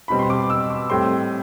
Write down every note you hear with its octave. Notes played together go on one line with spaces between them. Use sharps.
B2 G3 C4 B5
C6
D6
E6
D6
A2 G3 C4 C6